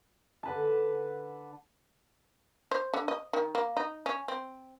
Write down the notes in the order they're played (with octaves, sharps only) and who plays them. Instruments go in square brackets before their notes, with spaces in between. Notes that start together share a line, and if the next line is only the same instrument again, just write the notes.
[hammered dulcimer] D3 B4 A5
[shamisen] C5
D3
D#5
D#3
A#3
D#4
C#4
C4